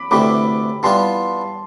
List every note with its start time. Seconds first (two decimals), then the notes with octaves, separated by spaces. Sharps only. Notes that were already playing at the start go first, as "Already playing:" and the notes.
Already playing: B5 D6
0.11 D2 C3 E3 A3 B5 D6
0.83 E3 G3 B3 F4 A5 C6